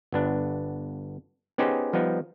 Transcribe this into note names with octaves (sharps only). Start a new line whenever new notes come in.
G1 B3 D4
B3 C#4 D#4 G4 G#4 C5
F3 G3 B3 D#4